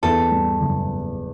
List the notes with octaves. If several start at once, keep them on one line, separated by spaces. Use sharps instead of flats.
E2 A4
G3
F#1